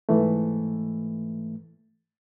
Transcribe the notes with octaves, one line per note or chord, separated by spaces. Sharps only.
G#2 E3 A3